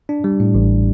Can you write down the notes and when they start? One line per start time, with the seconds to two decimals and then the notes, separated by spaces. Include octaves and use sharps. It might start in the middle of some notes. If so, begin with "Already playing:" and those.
0.09 D4
0.24 G3
0.40 A2
0.55 A1